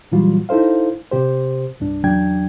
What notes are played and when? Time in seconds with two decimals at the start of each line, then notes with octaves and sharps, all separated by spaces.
0.12 A#2 E3 F#3 G3 F4 F#4
0.49 D#4 E4 A4 C5 F5
1.11 C3 G4 C5
1.80 C2 G2 D4
2.04 E2 C#3 F#3 D4 G5 G#6